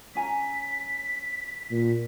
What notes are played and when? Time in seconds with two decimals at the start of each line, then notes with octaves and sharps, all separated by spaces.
0.15 C#4 G#5 A#5 B6
1.71 A#2